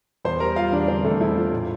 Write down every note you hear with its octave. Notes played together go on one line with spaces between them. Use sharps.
E2 C5 C6
G3 A#4 A#5
G3 F4 F5
E2 D4 D5
D3 C4 C5
E2 A3 A4
E2 E4
E2 F4
A2 F4